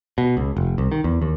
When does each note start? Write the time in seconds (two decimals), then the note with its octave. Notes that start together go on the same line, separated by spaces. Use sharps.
0.18 B2
0.37 C#2
0.57 F1
0.78 C2
0.92 D#3
1.04 E2
1.22 D#2